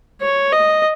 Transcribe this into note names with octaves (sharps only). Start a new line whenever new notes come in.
C#5
D#5